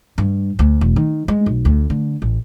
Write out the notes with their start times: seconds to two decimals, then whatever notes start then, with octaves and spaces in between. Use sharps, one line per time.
0.18 G2
0.59 D2
0.81 E1
0.96 D#3
1.28 G#3
1.46 B1
1.65 D2
1.90 D3
2.22 A1